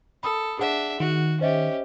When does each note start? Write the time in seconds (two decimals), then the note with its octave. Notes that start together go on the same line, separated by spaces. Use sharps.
0.23 A4 B5 D#6 E6
0.59 D4 G#4 E5 F#5
1.00 D#3 F#4
1.41 C#4 G4 C5 D#5 E5